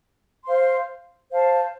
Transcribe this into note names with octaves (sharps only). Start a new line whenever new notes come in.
C5 F5 C6
C5 F5 A5